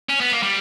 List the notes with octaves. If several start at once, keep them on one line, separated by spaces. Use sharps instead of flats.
C#4
B3
A#3
G3